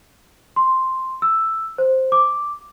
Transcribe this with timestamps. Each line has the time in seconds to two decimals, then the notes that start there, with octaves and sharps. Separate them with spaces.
0.56 C6
1.22 E6
1.78 C5
2.12 D6